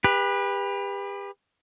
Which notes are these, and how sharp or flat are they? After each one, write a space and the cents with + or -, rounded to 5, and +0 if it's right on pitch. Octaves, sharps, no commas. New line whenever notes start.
G4 +35 B4 -10